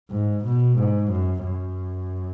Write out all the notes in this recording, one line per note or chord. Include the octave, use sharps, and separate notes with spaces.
G#2
B2
G#2
F#2
F#2